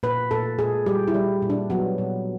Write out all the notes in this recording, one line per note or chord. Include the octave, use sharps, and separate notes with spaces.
A#2 B4
A#2 A4
A#2 G#4
G3 G4
E4
G3
A#2
D4
F#3 B3
A#2